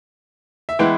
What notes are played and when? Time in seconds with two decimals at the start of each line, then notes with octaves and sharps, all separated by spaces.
0.69 E5
0.79 E3 G#3 B3 E4 G5